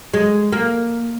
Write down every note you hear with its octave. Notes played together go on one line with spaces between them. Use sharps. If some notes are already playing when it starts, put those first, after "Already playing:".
G#3
A#3